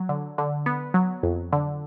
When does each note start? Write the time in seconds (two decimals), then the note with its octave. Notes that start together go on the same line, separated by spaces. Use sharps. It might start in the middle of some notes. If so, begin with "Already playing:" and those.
Already playing: F#3
0.09 D3
0.38 D3
0.66 B3
0.94 F#3
1.23 F2
1.53 D3